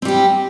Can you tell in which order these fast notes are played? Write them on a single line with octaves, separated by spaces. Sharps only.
C4 G3 G4